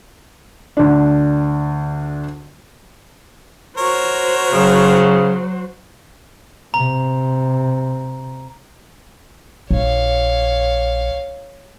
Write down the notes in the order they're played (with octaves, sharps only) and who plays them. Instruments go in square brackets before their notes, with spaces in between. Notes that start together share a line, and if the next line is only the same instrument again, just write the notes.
[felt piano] D2 D4
[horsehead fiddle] F#4 C5 [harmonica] A#4 C#5
[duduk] C#3 [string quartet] F#3
[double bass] C3 [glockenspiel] A#5
[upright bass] A#1 [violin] C#5 F5